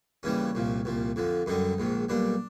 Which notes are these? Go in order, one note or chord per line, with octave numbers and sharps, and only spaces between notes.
D#2 C#3 E3 G3 C#4
C2 A#2 F3
C2 A#2 F3
F2 D3 F3
F#2 D3 G3 D#4
A#1 G#2 D#3
B1 A#2 G3 D4